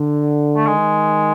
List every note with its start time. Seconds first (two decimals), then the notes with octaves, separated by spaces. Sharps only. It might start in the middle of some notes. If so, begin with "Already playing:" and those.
Already playing: D3
0.56 A3
0.67 D#3 G#3